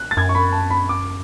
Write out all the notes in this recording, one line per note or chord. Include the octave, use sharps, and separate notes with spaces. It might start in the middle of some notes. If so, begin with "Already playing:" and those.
Already playing: F#6
A6
F#2 G#6
C#6
B5
A5
B5
D6